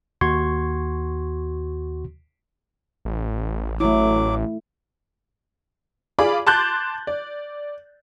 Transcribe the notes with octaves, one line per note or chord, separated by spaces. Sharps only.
D#2 F#4 C6 C#6 G#6
A1
F#3 A3 E4 D6
F4 G#4 D5 B5 D6
A5 C6 D6 F#6 G6 A6
D5